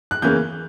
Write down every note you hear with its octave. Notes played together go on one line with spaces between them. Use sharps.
F#6
E2 C#3 E3 A#3 C#4 G6